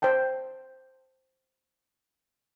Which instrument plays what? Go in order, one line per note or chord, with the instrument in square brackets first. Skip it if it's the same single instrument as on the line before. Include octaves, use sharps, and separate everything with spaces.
[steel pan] C5 D5 G5 A5